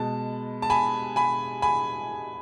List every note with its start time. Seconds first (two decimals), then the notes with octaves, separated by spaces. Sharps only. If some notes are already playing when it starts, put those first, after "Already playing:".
Already playing: B2 G#3 A5
0.62 A5
0.70 G#5 B5
1.16 G#5 B5
1.62 G#5 B5